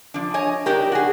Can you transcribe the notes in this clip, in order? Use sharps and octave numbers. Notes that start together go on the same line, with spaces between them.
F3 D4
C#5 D#5 G#5
D4 D#4 G4 A#4
F#4 G#4